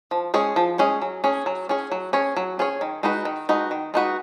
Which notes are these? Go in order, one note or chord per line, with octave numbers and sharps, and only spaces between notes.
F3
G#3 C#4 G#4 C#5
F3
G#3 C#4 G#4 C#5
F#3
C#4 G#4 C#5
F#3
C#4 G#4 C#5
F#3
C#4 G#4 C#5
F#3
C#4 G#4 C#5
D#3
G#3 D#4 F#4 B4
D#3
G#3 D#4 F#4 B4
D#3
G#3 D#4 F#4 B4